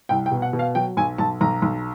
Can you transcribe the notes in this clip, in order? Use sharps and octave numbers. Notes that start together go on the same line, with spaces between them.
C2 G5
G5
B2
F#5
B2
F5
F#3 G5
B1 G#5
B1 A5
B1 A#5
B1